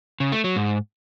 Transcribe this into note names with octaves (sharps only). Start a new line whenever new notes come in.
C#3
A3
F#3
G#2